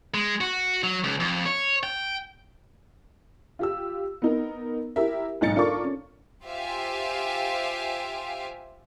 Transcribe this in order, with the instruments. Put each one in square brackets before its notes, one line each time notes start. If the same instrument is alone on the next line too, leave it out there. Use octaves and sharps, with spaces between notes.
[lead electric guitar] G#3
F#4
F#3
C#2
F2
C#5
G5
[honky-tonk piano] F4 G4 E6
B3 D#4 A#4
E4 G4 A#4 E5
B1 G#2 D#4 A6 C#7
D4 F4 A4 A#4 C#6 D6
C#4
[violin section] F4 G4 C5 E5 F5 G#5